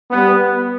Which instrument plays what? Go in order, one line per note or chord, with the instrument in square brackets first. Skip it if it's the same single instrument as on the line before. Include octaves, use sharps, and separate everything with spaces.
[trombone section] G3 B3